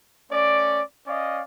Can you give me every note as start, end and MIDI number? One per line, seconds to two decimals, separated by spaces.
0.31 0.81 57
0.31 0.81 61
0.31 0.81 74
1.07 1.41 61
1.07 1.41 74
1.07 1.41 75
1.07 1.41 77